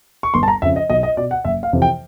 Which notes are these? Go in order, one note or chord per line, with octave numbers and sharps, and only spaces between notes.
C#6
G1 C6
A5
A#5
F2 C#3 E5
D#5
B1 D#5
D#5
B2 D5
F#5
F#1 E5
F5
F2 C3 E3
G5